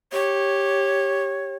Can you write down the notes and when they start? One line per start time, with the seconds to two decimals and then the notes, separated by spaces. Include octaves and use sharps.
0.12 G4 C#5